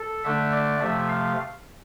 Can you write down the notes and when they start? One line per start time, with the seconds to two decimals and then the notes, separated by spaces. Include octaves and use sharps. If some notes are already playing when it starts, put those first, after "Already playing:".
Already playing: A4
0.24 D3 A3 D4 E5
0.52 D5
0.80 C3 F3 A3 E5
1.08 F5